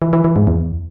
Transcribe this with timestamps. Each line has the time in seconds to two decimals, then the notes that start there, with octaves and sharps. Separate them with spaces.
0.02 E3
0.13 E3
0.24 E3
0.36 G#2
0.47 E2